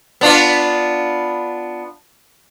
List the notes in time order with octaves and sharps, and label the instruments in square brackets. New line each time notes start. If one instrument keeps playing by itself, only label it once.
[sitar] B3 D4 F4